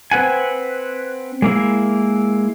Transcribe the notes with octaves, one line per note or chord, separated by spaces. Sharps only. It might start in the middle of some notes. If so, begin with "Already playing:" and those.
C4 B4 F#5 G#5
G#3 A#3 E4